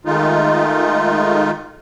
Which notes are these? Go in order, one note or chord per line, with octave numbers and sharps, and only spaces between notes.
D#3 G#3 A3 D#4 F4